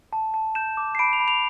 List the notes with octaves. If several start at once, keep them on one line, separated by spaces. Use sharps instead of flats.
A5
A5
G6 E7
D6
C7
B5 D7
F7
B5
F7